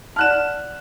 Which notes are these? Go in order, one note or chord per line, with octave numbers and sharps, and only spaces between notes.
D5 F#5 A5 F6 F#6 E7